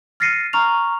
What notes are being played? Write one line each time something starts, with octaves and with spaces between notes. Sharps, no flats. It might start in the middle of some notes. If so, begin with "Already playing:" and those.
F6 A6 A#6 C7 C#7 D#7
A#5 C#6 F6 F7